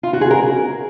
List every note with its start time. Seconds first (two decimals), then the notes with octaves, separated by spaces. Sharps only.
0.03 F4
0.13 F#4
0.21 G#4
0.30 A#4